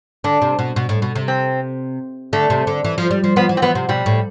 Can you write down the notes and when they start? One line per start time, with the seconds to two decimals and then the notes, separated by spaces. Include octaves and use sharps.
0.24 D3 D4
0.42 C3
0.59 B2
0.76 B2
0.89 A2
1.02 B2
1.15 C3
1.28 C4
2.33 D3 A3
2.50 C3
2.67 D3
2.84 E3
2.98 F3
3.11 G3
3.24 F3
3.36 F3 B3
3.49 E3
3.57 C4
3.62 E3 B3
3.75 C3
3.89 B2 G3
4.06 A2